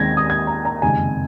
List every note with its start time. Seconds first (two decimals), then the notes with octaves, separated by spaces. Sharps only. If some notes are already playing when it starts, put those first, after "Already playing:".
Already playing: D#2 D#3 G#3 C4 G#6 A#6
0.17 D#6
0.30 G#6
0.47 A#5
0.65 A#5
0.82 F#1 F2 C3 D#3 G#3 G#5